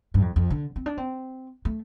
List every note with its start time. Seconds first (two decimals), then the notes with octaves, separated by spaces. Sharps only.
0.14 G2
0.22 F2
0.36 F2
0.50 D3
0.76 C4
0.86 D4
0.97 C4
1.65 A3